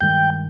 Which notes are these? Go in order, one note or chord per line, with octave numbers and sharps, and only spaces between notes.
G2 D#3 G#3 G5